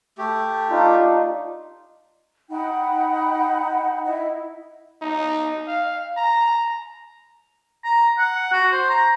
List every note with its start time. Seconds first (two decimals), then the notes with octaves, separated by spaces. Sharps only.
0.18 A3 G4
0.71 D4 D#4 F4
2.50 D#4 F#5 G5 B5
4.05 E4 D#5
5.02 D#4
5.68 F5
6.17 A#5
7.84 A#5
8.18 F#5
8.52 F#4
8.72 C5
8.89 A#5